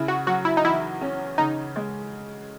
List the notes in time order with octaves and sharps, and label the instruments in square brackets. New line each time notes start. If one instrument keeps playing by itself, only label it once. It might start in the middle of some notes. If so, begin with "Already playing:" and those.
Already playing: [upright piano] C#3 [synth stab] E4
[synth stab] F#4
[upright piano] F#3 [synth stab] F#4
[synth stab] E4
D#4
[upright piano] E2 [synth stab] E4
[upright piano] C#4
[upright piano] C#3 [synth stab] D#4
[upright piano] G#3